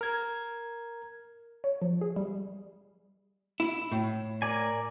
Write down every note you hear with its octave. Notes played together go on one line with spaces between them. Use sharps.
A#4 G#6
C#5
F3
G#4
G3
E4
A2
A#4 D5 G#5